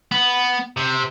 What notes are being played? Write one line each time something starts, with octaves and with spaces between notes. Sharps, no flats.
B3
C3